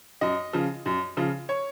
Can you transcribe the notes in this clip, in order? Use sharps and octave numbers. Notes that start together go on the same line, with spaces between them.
F#2 D#5
C#3 F3
F#2
C#3 F3
C#5